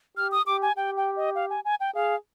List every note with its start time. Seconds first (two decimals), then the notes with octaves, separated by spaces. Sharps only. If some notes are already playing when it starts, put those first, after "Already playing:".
0.17 G4 F6
0.32 D#6
0.46 G4 D6
0.62 G#5
0.77 G4 G5
0.97 G5
1.16 D#5
1.35 F5
1.50 G#5
1.65 G#5
1.80 G5
1.95 G#4 F5